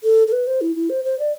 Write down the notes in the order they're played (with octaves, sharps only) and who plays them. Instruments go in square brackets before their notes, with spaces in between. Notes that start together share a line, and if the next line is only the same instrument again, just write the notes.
[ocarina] A4
A4
B4
C5
E4
E4
C5
C5
D5